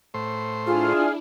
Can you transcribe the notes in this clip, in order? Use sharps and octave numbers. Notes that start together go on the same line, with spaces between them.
A2 C5
D4 E4 F4 G#4 F6